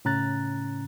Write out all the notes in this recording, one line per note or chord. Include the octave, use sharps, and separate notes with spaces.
A2 C#3 C#4 A#5 F#6 A6